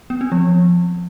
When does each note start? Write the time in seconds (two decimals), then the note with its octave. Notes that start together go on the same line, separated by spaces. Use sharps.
0.10 B3
0.21 C4
0.32 F3